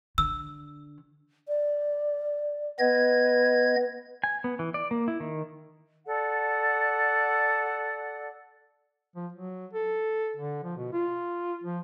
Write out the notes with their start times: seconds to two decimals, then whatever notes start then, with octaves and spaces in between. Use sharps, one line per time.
0.18 D3 E6
1.48 D5
2.79 B3 B4 D#5 G#6
4.24 G#5
4.44 B3
4.59 E3
4.74 D5
4.91 A#3
5.08 E4
5.20 D#3
6.05 A4 D5 F#5
9.16 F3
9.33 F#3
9.73 A4
10.36 D3
10.64 F3
10.77 B2
10.93 F4
11.64 F3